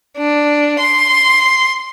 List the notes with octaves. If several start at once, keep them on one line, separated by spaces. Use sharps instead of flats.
D4
C6